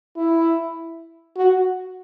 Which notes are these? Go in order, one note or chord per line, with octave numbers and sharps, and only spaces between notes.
E4
F#4